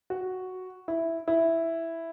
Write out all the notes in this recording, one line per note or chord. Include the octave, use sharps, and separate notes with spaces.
F#4
E4
E4